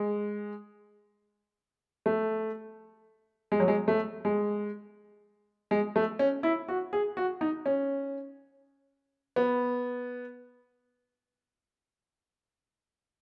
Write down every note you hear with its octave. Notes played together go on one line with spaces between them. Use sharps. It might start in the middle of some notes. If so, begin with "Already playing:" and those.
Already playing: G#3
A3
G#3
F#3
G#3
A3
G#3
G#3
A3
C#4
E4
F#4
G#4
F#4
D#4
C#4
B3